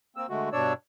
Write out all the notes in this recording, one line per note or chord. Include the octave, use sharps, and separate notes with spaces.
A#3 C4 E6
D3 G#3 A3 F#4
G2 B2 D4 C#5 D5 E6